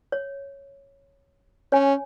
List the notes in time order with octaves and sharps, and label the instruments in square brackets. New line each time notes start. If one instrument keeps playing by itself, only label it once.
[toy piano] C#5
[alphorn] C#4 [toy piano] C#5 G#5